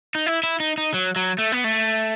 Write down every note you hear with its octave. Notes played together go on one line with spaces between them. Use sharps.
D#4
E4
E4
D#4
D#4
F#3
F#3
A3
B3
A3